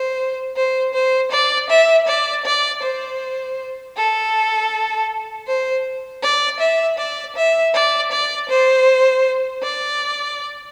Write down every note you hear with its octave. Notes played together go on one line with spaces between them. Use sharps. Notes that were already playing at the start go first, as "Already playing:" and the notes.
Already playing: C5
C5
C5
D5
E5
D5
D5
C5
A4
C5
D5
E5
D5
E5
D5
D5
C5
D5